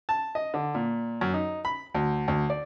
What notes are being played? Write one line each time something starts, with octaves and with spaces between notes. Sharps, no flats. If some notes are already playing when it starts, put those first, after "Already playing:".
A5
D#5
D3
A#2
F#2
D#4
B5
D2
D2
D5